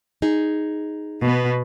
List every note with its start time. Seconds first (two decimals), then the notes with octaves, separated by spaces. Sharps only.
0.22 D#4 G#4
1.21 B2 B3